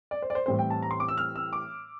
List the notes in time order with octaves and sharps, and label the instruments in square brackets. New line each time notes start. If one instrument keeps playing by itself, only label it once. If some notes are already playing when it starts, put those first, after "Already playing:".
[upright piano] D5
C5
D5
C5
A2 E3 G3 C4 C5
G5
A5
A#5
C6
D6
E6
F6
E6
D6